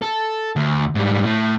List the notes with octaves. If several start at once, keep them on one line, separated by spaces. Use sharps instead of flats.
A4
D2
G#2 G3
A2